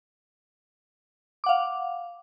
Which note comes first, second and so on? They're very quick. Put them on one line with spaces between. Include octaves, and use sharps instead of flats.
D6 F#5 F5